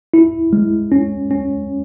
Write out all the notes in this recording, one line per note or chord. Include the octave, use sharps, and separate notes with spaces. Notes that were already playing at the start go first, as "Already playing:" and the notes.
E4
G#3
C#4
C#4